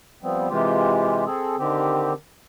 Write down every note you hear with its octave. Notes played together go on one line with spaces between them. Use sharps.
F3 G3 B3 C4
C3 E3 G#3 F4 G4
C4 G#4 A4
D3 D#3 C4 G4